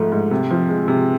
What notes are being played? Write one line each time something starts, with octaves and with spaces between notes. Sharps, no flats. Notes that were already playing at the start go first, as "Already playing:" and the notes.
Already playing: G#2 F3 A3
G#2
C3
F3
G#3
C3